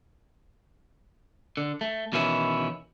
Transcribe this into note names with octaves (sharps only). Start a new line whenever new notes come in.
D3
A3
B2 D#3 E3 C#4 E4